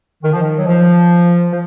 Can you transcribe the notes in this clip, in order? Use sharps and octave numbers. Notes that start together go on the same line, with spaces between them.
D#3
F3
D#3
F#3
F3
F3